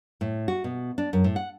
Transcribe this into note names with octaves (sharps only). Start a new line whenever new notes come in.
A2
F#4
B2
D4
F#2
A2
F#5